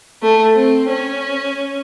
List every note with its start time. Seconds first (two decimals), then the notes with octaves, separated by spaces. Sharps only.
0.23 A3
0.54 C4
0.89 C#4